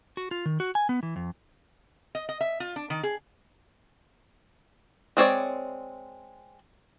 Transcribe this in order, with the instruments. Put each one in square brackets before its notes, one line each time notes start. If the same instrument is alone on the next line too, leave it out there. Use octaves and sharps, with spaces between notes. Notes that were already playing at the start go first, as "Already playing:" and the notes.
[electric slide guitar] F#4
F4
D#3
F#4
G#5
B3
E3
F2
[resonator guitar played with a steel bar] D#5
D#5
E5
F4
D4
D#3
G#4
[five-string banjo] G#3 C4 C#5 D5